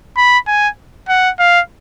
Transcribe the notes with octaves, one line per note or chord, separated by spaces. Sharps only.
B5
G#5
F#5
F5